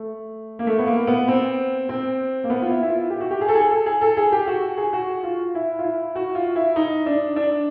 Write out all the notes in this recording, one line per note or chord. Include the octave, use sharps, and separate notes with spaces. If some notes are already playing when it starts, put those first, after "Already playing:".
Already playing: A3
A#3
A3
B3
A#3
B3
C4
C4
A#3
B3
F4
E4
E4
F4
G4
F#4
G4
G#4
A4
G#4
A4
G#4
A4
G#4
G4
F#4
G#4
F#4
F4
E4
F4
E4
F#4
F4
E4
D#4
D4
D4